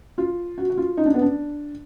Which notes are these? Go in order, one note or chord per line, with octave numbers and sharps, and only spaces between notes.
F4
F#4
F#4
F4
D#4
D4
B3
D4